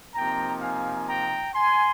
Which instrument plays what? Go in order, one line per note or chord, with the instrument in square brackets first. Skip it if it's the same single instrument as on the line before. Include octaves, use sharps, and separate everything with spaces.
[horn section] C3 F3 A#3 D#4 G5 A#5
F5 G#5
G5 A#5
G#5 C6